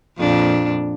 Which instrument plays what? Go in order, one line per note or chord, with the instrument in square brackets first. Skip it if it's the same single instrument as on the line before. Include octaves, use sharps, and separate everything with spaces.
[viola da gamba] F2 A#2 D4